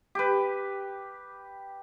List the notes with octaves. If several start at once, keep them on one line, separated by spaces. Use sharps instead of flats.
G4 B4